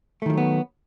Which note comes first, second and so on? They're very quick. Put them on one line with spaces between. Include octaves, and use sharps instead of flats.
A3 D#3 F3 F#3 B3